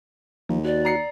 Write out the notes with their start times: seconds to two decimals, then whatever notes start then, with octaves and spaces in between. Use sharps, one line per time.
0.49 D#2 F3 A#3
0.65 F#4 D5
0.85 A#5 C7 C#7